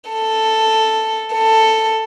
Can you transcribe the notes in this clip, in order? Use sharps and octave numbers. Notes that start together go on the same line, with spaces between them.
A4
A4